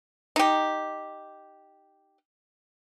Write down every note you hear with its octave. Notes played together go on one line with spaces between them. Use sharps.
D#4 G4